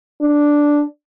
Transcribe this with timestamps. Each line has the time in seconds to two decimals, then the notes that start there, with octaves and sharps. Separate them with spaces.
0.22 D4